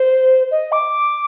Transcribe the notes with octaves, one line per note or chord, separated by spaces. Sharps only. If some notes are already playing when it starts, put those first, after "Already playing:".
Already playing: C5
D#5
D6